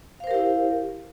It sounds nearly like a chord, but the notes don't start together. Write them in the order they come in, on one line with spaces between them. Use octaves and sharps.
F5 C5 A#4 G4 E4